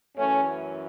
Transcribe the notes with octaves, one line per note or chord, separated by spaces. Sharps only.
F#2 E3 A3 C#4